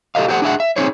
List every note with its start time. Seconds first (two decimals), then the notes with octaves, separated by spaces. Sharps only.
0.15 G4 A4 A#4 D#5 F5
0.28 G4 A4 C5 F#5
0.42 D4 G#4 E5 F#5
0.60 E5
0.76 C4 D#4 G#4 C5 C#5